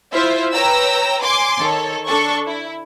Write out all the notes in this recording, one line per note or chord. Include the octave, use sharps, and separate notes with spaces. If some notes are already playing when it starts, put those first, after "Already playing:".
E4 F4 C5 E5
B4 C#5 G5 A#5 E6
G#5 C6 D6
D#3 A4 C#5
D4 A4 C#6
E4